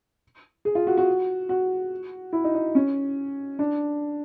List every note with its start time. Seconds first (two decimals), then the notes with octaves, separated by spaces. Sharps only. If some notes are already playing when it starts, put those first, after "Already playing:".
0.65 G#4
0.75 F4
0.87 F#4
0.97 F#4
1.49 F#4
2.33 E4
2.44 D#4
2.55 D#4
2.75 C#4
3.59 D4